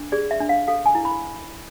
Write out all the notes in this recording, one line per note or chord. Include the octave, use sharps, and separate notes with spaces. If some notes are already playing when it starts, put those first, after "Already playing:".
Already playing: D4
G#4 D5
E5
D4
F5
A4 F5
G#5
E4
B5